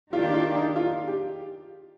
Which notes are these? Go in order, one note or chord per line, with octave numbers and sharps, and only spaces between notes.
D#3 A#3 D4 F4 G4
F4
D#4
F4
G4